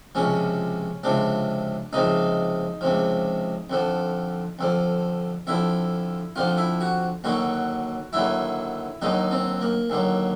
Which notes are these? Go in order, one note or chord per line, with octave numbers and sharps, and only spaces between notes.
C#2 C3 F3 C#4
C#2 C3 F3 D4
C#2 C3 F3 D#4
C#2 C3 F3
F2 D3 F3
F2 D3 F3
F2 D3 F3 E4
F2 D3 F3 F4
E4
F#4
D#2 D3 F#3 F#4
D#2 D3 F#3 E4
D#2 D3 F#3 D#4
C4
A#3
D#2 D3 F#3